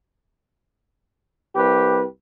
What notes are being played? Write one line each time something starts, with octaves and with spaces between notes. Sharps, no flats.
C2 G4 B4